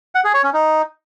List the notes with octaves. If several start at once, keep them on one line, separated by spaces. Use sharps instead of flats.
F#5
G#4
C#5
C#4
D#4